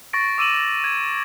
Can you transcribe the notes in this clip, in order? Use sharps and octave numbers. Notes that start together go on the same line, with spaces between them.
C#6 A6 A#6 D7
D6 E6 D#7 E7 F#7
G#6